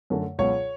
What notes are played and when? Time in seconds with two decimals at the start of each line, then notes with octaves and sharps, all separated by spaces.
0.10 F#2 D3 A3
0.38 C#2 B2 F#3 C#5